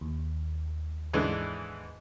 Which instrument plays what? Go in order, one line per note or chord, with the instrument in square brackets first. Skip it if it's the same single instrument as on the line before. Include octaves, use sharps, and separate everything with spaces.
[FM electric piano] D#2
[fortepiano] G#2 D3 E3